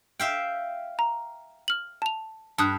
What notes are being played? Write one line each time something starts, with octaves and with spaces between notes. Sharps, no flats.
E5 F5 G5
A#5
F6 F#7
A5 F7
G2 A5 D#6 F#6